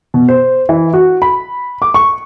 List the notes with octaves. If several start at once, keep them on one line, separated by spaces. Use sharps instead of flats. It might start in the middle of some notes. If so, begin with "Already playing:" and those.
B2
C5
E3
F#4
B5
D6
C#6